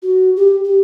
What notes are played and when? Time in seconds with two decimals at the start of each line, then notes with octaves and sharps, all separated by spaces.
0.02 F#4
0.36 G4
0.64 G4